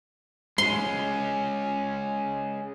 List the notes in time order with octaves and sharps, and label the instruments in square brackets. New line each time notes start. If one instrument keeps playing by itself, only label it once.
[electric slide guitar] G#3 C#4 [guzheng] C6